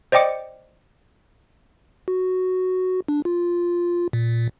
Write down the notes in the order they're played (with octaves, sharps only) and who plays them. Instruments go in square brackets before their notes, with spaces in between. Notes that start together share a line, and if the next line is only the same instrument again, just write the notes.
[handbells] C5 D5 D#5 G5 D6 C#7
[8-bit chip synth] F#4
D4
F4
A#2